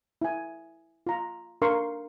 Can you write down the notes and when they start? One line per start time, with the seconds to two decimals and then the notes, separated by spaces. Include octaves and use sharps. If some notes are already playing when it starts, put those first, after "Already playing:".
0.22 E4 G#5
1.06 F4 A#5
1.62 D4 A#4 F5 C6 C#6